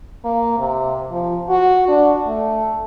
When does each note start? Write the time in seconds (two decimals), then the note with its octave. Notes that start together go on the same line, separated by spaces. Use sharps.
0.24 A#3
0.59 C3
1.11 F3
1.49 F#4
1.88 D4
2.27 A3